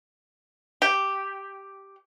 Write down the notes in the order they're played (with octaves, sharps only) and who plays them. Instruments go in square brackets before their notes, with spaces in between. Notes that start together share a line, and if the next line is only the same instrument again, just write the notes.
[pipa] G4